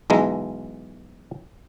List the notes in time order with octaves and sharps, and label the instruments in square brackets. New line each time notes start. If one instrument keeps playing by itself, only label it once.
[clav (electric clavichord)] B1 E3 G#3 A#5